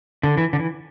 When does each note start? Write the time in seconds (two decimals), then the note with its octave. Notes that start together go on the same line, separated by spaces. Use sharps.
0.23 D3
0.37 E3
0.53 D3
0.59 E3